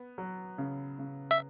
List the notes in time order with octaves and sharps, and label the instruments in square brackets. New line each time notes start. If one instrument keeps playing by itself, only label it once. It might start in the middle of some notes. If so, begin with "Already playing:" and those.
Already playing: [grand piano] B3
F#3
C#3
C#3
[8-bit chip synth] E5